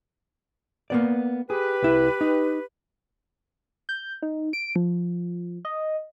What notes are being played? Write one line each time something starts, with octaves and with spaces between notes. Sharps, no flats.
A#3 B3 D5
G4 G#4 B4
C2 E4
D#4
G6
D#4
D7
F3
D#5